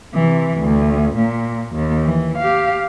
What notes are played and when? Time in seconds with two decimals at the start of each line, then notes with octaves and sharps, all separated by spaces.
0.14 C3 E3
0.59 D2
1.16 A#2
1.75 D#2
2.03 E3
2.38 G4 F5